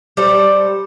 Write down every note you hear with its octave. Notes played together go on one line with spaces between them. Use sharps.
G3 A4 C5